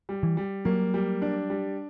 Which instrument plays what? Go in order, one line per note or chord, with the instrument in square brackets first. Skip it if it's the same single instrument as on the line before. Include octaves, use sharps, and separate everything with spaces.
[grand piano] G3
[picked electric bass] E3
[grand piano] G3
[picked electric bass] F#3 [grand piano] A#3
[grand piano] G3
D4
G3